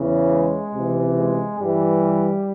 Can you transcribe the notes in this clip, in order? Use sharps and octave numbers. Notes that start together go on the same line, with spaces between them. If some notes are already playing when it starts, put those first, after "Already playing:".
Already playing: E2 C#3 E3
G#3
C#2 C3 E3
G#3
G2 E3 G3